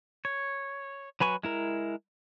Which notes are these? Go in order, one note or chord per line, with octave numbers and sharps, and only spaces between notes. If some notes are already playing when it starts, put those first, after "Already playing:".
C#5
F#3 B4 G#5 C#6
G#3 E4 A#4